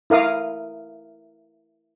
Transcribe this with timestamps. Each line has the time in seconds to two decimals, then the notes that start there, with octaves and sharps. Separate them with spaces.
0.10 E4 A#4 F5 D#6